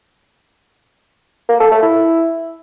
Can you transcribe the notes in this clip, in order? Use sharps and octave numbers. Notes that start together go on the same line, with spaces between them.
A#3
A4
A3
E4